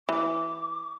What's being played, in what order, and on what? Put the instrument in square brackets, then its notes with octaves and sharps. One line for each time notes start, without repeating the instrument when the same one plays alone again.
[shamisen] E3 [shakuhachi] D6